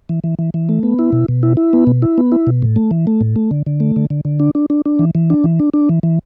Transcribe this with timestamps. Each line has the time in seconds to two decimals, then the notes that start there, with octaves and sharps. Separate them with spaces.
0.09 E3
0.24 E3
0.39 E3
0.54 E3
0.69 A3
0.83 B3
0.99 E4
1.12 B2
1.28 B2
1.43 E4
1.57 E4
1.73 B3
1.87 B2
2.02 E4
2.18 B3
2.32 E4
2.47 B2
2.62 A2
2.76 A3
2.91 E3
3.07 A3
3.21 A2
3.36 A3
3.51 D3
3.66 D3
3.80 A3
3.96 D3
4.10 D3
4.25 D3
4.40 D4
4.55 D4
4.70 D4
4.85 D4
4.99 E3
5.15 E3
5.30 D4
5.44 E3
5.59 D4
5.74 D4
5.89 E3
6.03 E3